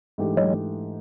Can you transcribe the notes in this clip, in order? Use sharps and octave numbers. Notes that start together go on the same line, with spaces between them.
G#2 E3 A3 D4 G4
F#3 G#3